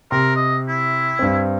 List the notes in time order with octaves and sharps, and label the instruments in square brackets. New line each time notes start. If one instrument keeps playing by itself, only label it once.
[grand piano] C3 C6 [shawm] A#4
[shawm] D#5
E4
[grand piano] G2 C4